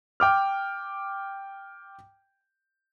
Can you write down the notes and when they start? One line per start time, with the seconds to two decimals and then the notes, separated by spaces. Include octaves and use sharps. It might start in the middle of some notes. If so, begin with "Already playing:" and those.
0.20 G5 D6 F6